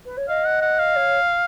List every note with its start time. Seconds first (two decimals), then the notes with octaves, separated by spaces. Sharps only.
0.05 B4
0.17 C#5
0.28 D#5 F5
0.45 F#5
0.62 F#5
0.79 F5
0.96 C#5